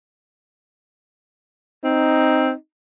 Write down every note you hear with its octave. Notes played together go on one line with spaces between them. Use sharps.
C4 D#4